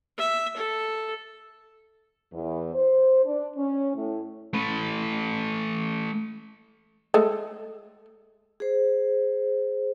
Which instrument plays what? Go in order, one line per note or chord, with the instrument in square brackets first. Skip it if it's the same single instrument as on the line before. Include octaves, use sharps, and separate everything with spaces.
[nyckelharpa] E5
A4
[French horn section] E2
C5
D4
C#4
A2
[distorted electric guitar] A3 B4
[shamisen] G#3 A3
[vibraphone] G#4 C5